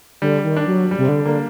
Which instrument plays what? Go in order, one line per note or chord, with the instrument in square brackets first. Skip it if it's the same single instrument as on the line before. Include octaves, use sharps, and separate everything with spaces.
[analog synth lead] D3 [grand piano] G3
[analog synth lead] D#3
[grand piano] D4
[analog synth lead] F#3
[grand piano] G3
[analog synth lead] C3
D3
[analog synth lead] D3 [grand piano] A#3